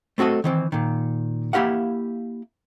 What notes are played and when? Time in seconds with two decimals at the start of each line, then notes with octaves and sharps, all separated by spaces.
0.18 A3 C4 F#4 A4 D#5
0.44 D#3 E3 C4
0.72 A#2 D#3
1.53 A#3 E4 G4 F5 F#5